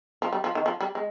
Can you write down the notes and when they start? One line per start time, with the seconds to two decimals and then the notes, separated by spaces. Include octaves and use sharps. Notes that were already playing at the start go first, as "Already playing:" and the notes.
0.22 F3
0.33 G3
0.44 F3
0.55 D#3
0.66 F3
0.81 G3
0.95 G#3